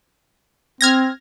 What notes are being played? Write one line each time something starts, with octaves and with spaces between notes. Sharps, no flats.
C4 F6 G#6 A#6